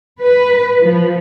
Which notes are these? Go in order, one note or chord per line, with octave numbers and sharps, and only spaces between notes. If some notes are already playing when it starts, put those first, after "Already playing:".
B4
F3